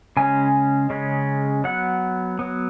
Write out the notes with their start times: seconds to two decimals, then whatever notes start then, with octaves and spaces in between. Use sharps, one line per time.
0.17 C#3 G#3 C#4 G#5
0.90 C#3 G#3 C#4
1.64 F#3 B3 F#5
2.39 F#3 B3